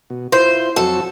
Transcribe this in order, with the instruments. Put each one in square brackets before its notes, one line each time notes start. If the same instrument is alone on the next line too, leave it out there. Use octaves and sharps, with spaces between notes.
[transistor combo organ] B2
[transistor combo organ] E4 F4 [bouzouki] C5
[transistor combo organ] F2 F#3 F#4 [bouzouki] A4